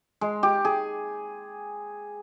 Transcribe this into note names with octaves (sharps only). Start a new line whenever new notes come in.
G#3
G4
G#4